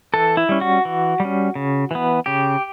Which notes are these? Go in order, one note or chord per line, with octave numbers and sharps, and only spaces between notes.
E3 A4
E4
G3 C#4
F#4
E3
G3 C#4
C#3
E3 B3
C#3 G4